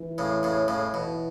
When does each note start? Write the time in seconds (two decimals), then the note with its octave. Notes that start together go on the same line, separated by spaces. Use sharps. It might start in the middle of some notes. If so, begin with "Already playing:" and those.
Already playing: E3
0.18 A2 C#3
0.43 A2 C#3
0.68 A2 C#3
0.93 B2 E3